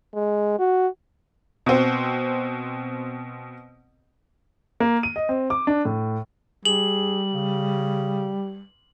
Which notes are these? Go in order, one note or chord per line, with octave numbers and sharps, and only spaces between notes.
G#3
F#4
B2 C4
A#3
D#7
D#5
C4
D6
D4
A2
G3 G#4 F#7
C#3